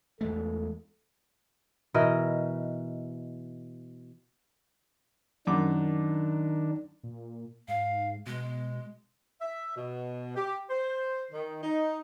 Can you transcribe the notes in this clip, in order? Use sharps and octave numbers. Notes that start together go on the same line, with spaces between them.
E2 G#3 A3 A4
B2 E3 A#4 D#5
F#2 D#3 D4 D6
A#2
G#2 F5
B2 G#3
E5
B2
G4
C5
D#3
D#4